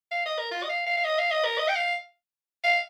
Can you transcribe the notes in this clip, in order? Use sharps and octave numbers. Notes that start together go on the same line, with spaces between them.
F5
D#5
A#4
F4
D#5
F5
F5
F5
D#5
F5
D#5
A#4
D#5
G5
F5
F5